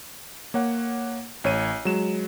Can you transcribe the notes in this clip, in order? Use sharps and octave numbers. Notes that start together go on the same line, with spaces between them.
A#3 C#5 F#5
A1 C#5 D#7
F#3 G#3 E7